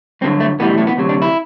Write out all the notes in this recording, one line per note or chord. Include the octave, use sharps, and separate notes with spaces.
G2 D3 F#3 C4
A3
B1 A2 E3 G3 B3
A3
B3
D2 C3 F#3
D4
E4